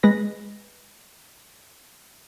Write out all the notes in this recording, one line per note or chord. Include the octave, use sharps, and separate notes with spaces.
G#3 B4 A#6